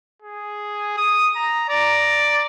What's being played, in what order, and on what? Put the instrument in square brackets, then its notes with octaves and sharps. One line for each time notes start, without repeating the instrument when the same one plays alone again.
[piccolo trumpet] G#4
D#6
A#5
[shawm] D5 [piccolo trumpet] A#5